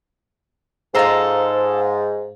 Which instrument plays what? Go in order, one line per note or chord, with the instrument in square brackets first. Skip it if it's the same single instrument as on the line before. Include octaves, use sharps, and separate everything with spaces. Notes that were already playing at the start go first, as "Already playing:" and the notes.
[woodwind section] G#2 [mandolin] F4 A4 A#5 [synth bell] C5 D#5 F5